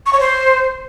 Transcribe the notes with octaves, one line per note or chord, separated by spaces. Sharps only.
C#6
C#5
C5